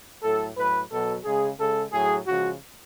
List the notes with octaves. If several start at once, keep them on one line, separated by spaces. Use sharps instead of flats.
A2 F#3 A4
A2 F#3 B4
B2 F#3 A4
C#3 G#3 G#4
C#3 G#3 A4
A2 F#3 G#4
C#3 F3 G#3 F#4